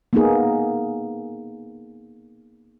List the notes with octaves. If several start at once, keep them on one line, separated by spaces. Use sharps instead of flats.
A#3 B3 D#4 G#4